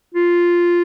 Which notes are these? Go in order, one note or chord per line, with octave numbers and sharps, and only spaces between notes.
F4